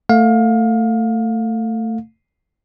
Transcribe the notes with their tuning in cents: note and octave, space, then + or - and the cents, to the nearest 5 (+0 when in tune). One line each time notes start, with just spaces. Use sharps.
A3 +20 F5 +25